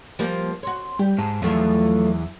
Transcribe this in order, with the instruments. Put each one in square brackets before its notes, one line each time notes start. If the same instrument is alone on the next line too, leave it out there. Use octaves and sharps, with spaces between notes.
[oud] F3 G3 A#3
[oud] F#4 C#5 [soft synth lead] C6
[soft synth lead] G3 [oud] G4
[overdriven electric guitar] G#2 [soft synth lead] A5
[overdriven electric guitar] E2 [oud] F3 A3 F4 [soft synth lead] F#3